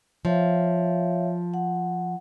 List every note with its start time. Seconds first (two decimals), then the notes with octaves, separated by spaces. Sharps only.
0.25 F3 C#5 E5 F5
1.54 F#5